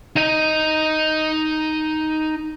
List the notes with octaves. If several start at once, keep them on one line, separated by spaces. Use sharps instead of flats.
D#4 D#5